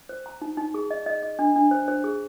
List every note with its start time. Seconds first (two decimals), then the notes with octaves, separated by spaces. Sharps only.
0.09 C5
0.26 A#5
0.41 D#4
0.57 D#4
0.74 G#4
0.91 D#5
1.06 D#5
1.22 D#5
1.39 D4
1.56 D4
1.71 C5
1.88 C5
2.04 G#4